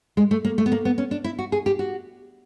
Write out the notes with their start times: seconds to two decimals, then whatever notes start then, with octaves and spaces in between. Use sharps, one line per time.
0.17 G#3
0.31 A3
0.45 A#3
0.58 A3
0.66 B3
0.72 A#3
0.85 B3
0.98 C#4
1.11 D4
1.24 E4
1.39 F#4
1.52 G#4
1.66 G4
1.79 F#4